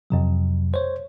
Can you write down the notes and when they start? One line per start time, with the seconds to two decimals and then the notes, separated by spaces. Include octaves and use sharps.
0.10 F2 C3 F#3
0.74 C5 C#5